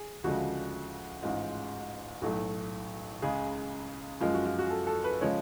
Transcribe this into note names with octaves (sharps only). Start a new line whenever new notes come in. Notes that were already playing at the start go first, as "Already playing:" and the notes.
Already playing: G#4
D2 C#3 F3 G#3 F#4
A1 G#2 G#3 F4
B1 A2 F#3 A3 F#4
C#2 C#3 G#3 G#4
F#2 F3 G#3 F4
F#4
F4
F#4
A4
A4
B4
C#3 F3 G#3 C#5